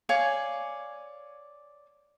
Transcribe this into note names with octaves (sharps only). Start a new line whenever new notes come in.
C#5 D5 F5 G#5